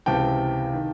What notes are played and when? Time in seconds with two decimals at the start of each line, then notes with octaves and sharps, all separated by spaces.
0.06 C#2 C3 E3 G5 A5
0.74 D#3